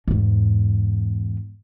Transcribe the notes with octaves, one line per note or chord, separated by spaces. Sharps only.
E2 G#2